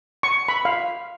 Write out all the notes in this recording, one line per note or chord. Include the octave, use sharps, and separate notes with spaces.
C#6
B5
F5